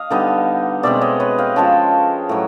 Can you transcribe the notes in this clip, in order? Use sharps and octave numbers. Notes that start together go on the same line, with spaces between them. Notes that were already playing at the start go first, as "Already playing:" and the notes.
Already playing: D#5 F5
D3 G3 B3 D#4
B2 G#3 C4 D5 E5
C#5 D#5
B4 C#5
F5 G5
F3 G#3 C#4 G5 A5
A2 F#3